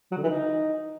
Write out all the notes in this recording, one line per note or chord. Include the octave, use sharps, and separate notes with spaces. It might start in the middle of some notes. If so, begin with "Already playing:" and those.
F#3
D3
E3
D#4